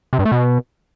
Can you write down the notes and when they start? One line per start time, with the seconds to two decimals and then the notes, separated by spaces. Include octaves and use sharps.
0.13 C3
0.19 G2
0.25 A3
0.32 B2